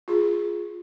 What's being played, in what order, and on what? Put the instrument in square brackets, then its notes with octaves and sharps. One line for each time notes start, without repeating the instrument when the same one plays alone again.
[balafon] F4 G#4